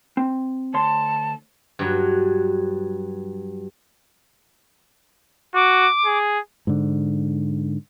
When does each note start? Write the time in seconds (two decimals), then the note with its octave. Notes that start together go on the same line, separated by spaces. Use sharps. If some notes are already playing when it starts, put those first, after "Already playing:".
0.17 C4
0.74 D2 C#5 A5 C6
1.79 G2 F#3
5.55 F#4 D6
6.06 G#4
6.67 G#2 D3